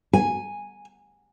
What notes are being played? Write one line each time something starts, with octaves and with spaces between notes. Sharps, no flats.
G#5